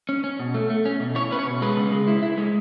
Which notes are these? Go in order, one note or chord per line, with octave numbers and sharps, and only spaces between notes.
C#4
C#4
B2
A3
A3
C#4
B2
E4 C#5
C#4 B4
C#5
B2
G#3 B4
C#3
G#3
E4
E4
G#3